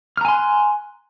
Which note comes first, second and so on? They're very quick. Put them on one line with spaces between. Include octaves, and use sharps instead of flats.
F6 A#5 G#5 C6 F#6